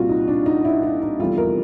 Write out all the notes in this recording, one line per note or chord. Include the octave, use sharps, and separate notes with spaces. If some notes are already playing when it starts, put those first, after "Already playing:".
Already playing: C2 A#2 G3 F4 F#4
D#4
D4
D#4
E4
D#4
D#4
F1 E2 C3 E3 G3 F4
A#4